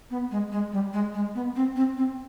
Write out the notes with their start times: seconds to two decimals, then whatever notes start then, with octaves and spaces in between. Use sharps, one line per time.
0.10 B3
0.31 G#3
0.52 G#3
0.72 G3
0.93 G#3
1.14 G#3
1.35 B3
1.56 C4
1.76 C4
1.97 C4